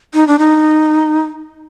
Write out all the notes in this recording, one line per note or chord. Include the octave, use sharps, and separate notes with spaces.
D#4
D4
D#4